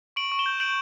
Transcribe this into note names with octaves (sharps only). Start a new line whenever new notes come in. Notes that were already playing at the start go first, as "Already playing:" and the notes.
C#6 D7 F#7
C#6
E7 G7
G6
G6 D7 F#7